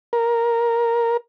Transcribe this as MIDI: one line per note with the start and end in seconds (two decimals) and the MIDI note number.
0.13 1.17 70